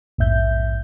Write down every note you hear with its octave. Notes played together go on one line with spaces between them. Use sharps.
A#1 E2 G#2 E5 G6